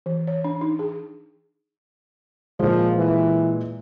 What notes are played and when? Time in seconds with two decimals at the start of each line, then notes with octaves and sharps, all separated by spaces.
0.06 E3
0.27 C#5
0.44 D4
0.61 D#4
0.79 G#4
2.59 A#2 F3 G#3
2.97 E3